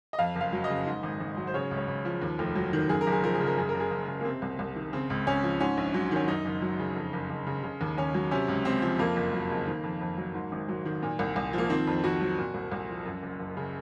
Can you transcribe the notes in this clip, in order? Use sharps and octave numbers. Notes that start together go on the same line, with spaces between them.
D#5
F2 F5
F#1
F5
F#3
D#5
C#3
G#2
G#1
G#1
F#3
C5
C#3 C#5
C#2
C#5
C#2
F3
D#2
F1
F#3
D#3
F#2 G#4
A#4
F#1
G#4
F3 A#4
G#4
C#3
A#4
F#2 G#4
A#4
F#1
G#4
F#1
C#3
A#3
C3 C4
C2
C2
D#3
C#3 C4
C#2
C#2 C#4
F3
G#2 C#4
A#1
F#3
D#3 C#4
F#2 D#4
F#1
F#3
C#3
F2
F#1
F#1
C#3
C#3
D#2
D#2 C#4
F#3
C3 C#4
C#2
C#2 C4
F3
F2 A#3
F#1
F#3
C#3
D#3
F2
F2
F#3
G#2
G#1
F#3
D#3
A#2
C2
C2
F3
A#3
D#3 C4
F2
F2 F#4
F#3
A#2
C2
C2
F3
F#2
F#1
F#1
C#3